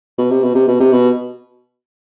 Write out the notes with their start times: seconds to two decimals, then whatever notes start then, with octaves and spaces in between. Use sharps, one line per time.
0.18 B2
0.31 C3
0.43 B2
0.55 C3
0.68 B2
0.80 C3
0.92 B2